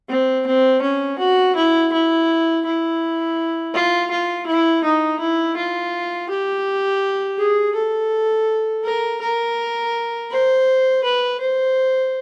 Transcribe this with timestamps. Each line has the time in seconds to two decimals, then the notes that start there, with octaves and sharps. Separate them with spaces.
0.09 C4
0.47 C4
0.82 C#4
1.19 F#4
1.56 E4
1.92 E4
2.65 E4
3.74 F4
4.11 F4
4.46 E4
4.84 D#4
5.20 E4
5.56 F4
6.29 G4
7.38 G#4
7.75 A4
8.84 A#4
9.21 A#4
10.31 C5
11.04 B4
11.40 C5